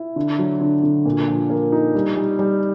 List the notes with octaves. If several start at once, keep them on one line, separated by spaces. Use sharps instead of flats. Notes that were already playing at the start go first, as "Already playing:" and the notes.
Already playing: E4
D3
F#3
D3
D3
A#2
F3
A#3
D#4
G3
G3
G3